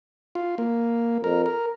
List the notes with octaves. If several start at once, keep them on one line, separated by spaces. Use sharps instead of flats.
F4
A#3
F2 A#4
A#4